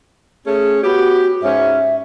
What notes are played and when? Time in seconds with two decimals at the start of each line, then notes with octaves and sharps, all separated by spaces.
0.46 A3 C#4 G#4
0.83 B3 F#4 G4
1.42 G#2 C#4 E5